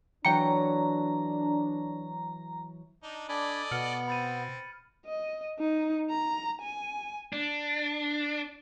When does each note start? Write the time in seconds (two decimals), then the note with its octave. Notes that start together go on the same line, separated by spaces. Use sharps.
0.25 E3 F#3 D4 G5 A#5 C#7
3.03 D4 D#4
3.29 D4 A4 D5 D#5 G#5 B5
3.71 B2 B3 F6 C#7 F#7
4.08 C4 B5 A6 D#7
5.06 D#5
5.59 D#4
6.10 A#5
6.62 G#5
7.33 D4